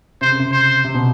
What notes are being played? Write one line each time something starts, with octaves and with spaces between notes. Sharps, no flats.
C3 C5
C#3
C3
C5
C3
B2